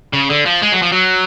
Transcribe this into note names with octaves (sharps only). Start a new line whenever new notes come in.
C#3
D3
F3
G#3
F#3
F3
F#3